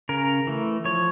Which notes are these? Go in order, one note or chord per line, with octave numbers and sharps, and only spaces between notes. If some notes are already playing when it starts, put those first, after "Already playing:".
C#3 A#4
E3 A3
F3 C#5